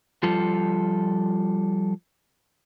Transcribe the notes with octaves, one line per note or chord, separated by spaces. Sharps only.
F3 G3 F4 A4